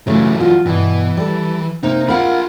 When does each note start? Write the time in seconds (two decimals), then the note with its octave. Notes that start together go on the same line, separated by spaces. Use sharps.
0.07 C#3 E3 F#3 A3
0.40 F4 F#4
0.66 G2 B2 E3
1.17 G3 A4
1.83 C3 A#3 D#4
2.09 F4 A#4 F5 F#5 B5